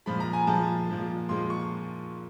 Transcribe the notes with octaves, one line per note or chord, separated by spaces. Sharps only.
A#2 F3 G#3 B5
A#5
G#5
A#2 F3 G#3 A5
A#2 F3 G#3
A#2 F3 G#3 C6
C#6